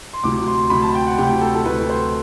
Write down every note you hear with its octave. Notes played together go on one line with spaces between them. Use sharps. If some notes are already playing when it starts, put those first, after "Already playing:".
C6
D2 C3 F#3 D6
C6
D2 C3 F#3 B5
A5
G5
F#5
D2 C3 F#3 G4
A4
A4
D2 C3 F#3 B4
C5